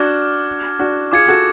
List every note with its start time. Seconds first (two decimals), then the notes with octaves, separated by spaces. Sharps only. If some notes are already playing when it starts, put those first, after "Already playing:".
Already playing: D4 F#4 D6 F6 G#6
0.79 D4 F#4
1.12 F4 G#4 D6 G#6 C#7
1.28 F#4 A4